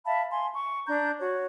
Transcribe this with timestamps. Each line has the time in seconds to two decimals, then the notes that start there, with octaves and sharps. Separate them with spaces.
0.05 E5 F5 A5 B5
0.31 G#5 C6
0.56 C#6
0.88 D4 A#5 G6
1.19 F#4 C#5